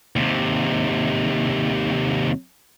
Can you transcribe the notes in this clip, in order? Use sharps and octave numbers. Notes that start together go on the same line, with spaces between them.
D#2 C3